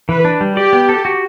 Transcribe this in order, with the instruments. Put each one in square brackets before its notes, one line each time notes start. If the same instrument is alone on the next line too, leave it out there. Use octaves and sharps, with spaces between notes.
[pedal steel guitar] E3 [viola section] B4
[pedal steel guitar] D4
G3
[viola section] G4 [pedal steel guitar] D5
[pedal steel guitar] B3
A4
F#4